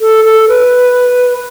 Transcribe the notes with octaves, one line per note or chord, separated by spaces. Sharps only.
A4
A4
B4